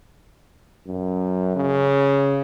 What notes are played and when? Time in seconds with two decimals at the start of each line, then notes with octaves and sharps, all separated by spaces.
0.87 F#2
1.56 C#3